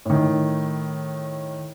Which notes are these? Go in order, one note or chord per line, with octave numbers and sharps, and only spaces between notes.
A2 D#3